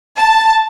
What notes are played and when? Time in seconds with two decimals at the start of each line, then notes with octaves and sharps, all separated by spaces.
0.19 A5